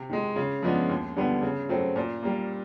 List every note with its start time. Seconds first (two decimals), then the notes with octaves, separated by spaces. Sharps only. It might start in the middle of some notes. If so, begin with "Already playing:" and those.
Already playing: C3
0.09 D#3 G#3
0.36 C#3
0.63 F3 G#3 B3 D4
0.89 D#2
1.16 D3 G3 B3
1.42 C#3
1.69 F#3 A3 C4
1.96 A#2
2.23 G3 A#3